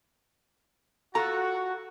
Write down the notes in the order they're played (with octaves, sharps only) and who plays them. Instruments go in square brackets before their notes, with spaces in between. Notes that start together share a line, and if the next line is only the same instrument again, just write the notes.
[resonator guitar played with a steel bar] F4 A4 [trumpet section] F#4 [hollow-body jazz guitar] A#5